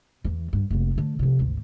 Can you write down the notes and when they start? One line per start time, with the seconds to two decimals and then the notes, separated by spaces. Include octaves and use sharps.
0.25 E2 E3
0.53 G2
0.71 F1 A#3
0.95 D3 A3
1.19 C3 F3
1.39 G#1 D2